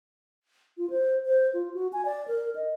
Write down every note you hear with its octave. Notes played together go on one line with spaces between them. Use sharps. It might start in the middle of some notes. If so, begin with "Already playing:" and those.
F4
C5
C5
F4
F#4
G#5
D5
A#4
D#5